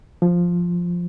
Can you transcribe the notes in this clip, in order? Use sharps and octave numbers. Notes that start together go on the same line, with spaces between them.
F3